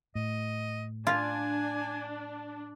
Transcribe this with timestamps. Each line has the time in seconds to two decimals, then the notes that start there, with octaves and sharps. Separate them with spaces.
0.15 A2 D#5
1.07 D4 F4 G#5